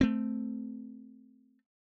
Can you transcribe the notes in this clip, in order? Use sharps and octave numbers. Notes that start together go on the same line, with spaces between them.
A3 C4